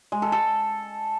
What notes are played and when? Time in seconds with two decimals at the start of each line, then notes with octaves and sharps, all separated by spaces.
0.12 G#3
0.22 A4
0.32 A4